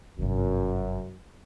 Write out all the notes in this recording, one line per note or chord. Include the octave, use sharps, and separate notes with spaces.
G1 F#2 C3